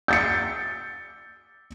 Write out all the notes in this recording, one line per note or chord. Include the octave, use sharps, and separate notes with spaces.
G6 A6 C#7